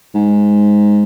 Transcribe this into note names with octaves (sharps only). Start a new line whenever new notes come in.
G#2